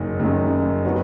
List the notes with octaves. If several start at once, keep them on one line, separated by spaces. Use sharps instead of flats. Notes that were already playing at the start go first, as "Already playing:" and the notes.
Already playing: F#1 F#2 D#3
F#1 F#2 D#3
D#3 F#3 B3 F#4